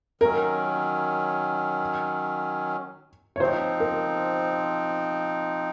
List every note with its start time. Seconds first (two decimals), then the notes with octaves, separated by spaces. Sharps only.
0.21 D#3 F#3 C#4 A#4
3.36 C#5
3.40 F3 C4 D#4 C5
3.80 A#4